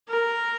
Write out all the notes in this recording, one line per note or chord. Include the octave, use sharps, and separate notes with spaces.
A#4